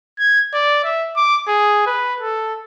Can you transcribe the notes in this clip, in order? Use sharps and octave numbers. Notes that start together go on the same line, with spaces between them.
G#6
D5
E5
D6
G#4
B4
A4